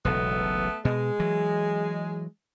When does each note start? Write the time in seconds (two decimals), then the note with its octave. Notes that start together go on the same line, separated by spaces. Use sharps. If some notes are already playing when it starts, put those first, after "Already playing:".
0.05 E1 B1 C#3 A3 B3 A4
0.85 B2 G#3
1.20 E3 F#3